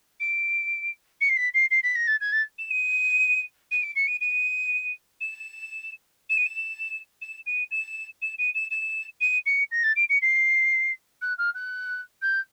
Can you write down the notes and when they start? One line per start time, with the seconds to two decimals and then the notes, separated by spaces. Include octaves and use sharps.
0.20 D7
1.21 C#7
1.29 C7
1.36 B6
1.54 C7
1.70 C7
1.83 B6
1.95 A#6
2.07 A6
2.20 G#6
2.32 A6
2.58 E7
2.70 D#7
3.71 D#7
3.83 D7
3.95 C#7
4.07 D#7
4.21 D#7
5.20 E7
6.29 E7
6.37 D#7
6.45 E7
7.21 E7
7.46 D#7
7.71 E7
8.22 E7
8.38 D#7
8.54 E7
8.71 E7
9.21 D#7
9.46 C#7
9.71 A#6
9.83 A6
9.96 D7
10.09 C#7
10.21 C7
11.21 F#6
11.38 F6
11.54 F#6
12.22 G6